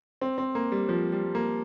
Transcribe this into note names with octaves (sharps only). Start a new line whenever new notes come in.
C4
C4
A#3
G3
F3
G3
A#3